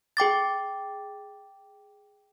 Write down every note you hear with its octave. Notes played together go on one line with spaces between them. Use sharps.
G#4 G5 D6 A6